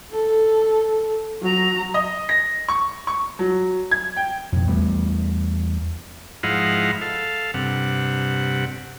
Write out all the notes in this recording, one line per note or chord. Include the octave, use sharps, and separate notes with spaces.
A4
F#3 A#5
D#5
A#6
C#6
C#6
F#3
G#6
G5
F2 B2
E2 G3 A3 B3
G#2 F3 E4 D#5 F5 F#5
A4 F5
G2 C3 F#5